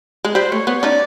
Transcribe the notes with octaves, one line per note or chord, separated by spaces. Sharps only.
G#3
G3 C5
A3 C#5
B3 C#5
C#5
C#4 D#4 D5